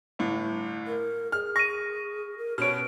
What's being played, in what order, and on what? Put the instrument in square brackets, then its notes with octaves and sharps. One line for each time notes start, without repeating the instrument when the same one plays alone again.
[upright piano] G1 A2
[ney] A#4
[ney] G#4 [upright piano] F6
[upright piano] C#6 [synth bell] A#6 D#7
[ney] A#4
[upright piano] B2 C#4 C#5 [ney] B4 [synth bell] F6 D7